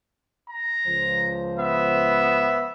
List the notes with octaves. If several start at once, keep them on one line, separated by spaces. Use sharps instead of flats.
A#5
C#2 F3 C5
B3 E5